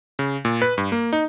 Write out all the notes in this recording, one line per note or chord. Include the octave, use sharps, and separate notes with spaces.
C#3
A#2
B4
G2
A#3
D#4